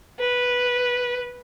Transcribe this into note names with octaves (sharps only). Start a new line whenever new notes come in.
B4